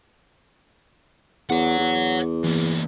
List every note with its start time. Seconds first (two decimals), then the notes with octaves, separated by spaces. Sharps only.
1.50 E2 C#5 F#5
1.79 E2
2.44 E3 A#3